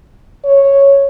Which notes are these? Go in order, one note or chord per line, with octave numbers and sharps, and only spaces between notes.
C#5